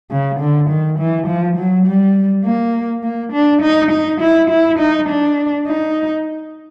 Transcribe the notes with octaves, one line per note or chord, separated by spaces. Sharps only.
C#3
D3
D#3
E3
F3
F#3
G3
A#3
A#3
D4
D#4
D#4
E4
E4
D#4
D4
D#4